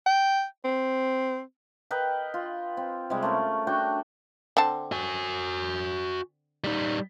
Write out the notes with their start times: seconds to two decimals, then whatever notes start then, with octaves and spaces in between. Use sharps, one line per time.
0.06 G5
0.64 C4
1.91 A#4 B4 D#5 G5
2.34 F4
2.77 C4
3.10 C3 G3 G#3
3.23 A3 C#4 A#4
3.67 D4 F#4 G5 C#6
4.57 D3 C4 A5
4.92 F#4 G#5
6.64 G3 D#4